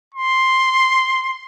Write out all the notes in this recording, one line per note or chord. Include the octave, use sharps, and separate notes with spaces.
C6